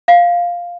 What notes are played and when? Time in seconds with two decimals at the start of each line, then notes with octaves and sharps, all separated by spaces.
0.08 F5